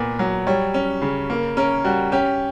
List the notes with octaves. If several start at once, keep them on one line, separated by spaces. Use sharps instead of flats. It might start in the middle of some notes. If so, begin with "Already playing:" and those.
Already playing: A#2 B3
F#3
G3 C#5
C#4
C#3
A#3
C#4 A#4
G3 F#4
C#4 G4